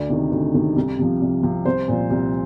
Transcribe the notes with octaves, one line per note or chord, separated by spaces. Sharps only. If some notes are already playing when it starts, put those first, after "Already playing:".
Already playing: D2 D5
C3 D#3
D2
C3 D#3
C2
C3 F3
C2
C3 F3
C2 C5
A#2 F3
C2